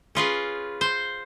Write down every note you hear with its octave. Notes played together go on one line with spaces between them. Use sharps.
C#4 F4 G#4 B4
C5